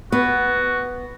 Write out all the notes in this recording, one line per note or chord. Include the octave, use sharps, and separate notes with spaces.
B3 F#4